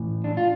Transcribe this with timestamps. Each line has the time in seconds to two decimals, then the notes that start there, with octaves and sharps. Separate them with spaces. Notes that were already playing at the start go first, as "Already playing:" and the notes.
Already playing: A2 E3
0.24 D4
0.37 F4